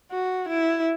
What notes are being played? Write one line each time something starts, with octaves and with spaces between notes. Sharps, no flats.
F#4
E4